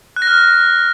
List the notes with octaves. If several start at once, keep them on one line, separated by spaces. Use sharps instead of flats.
F#6
A#6
F6